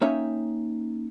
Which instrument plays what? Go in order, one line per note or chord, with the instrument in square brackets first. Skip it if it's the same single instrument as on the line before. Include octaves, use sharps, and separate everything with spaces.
[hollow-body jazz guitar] A#3 C#4 D#4 C#5 E5 G5